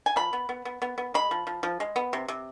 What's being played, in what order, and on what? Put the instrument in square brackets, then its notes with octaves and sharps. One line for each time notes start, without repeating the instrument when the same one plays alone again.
[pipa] G#5
F3 B5
B3
B3
B3
B3
B3
G#3 B5
F3
F3
F3
G#3
B3
C3
C3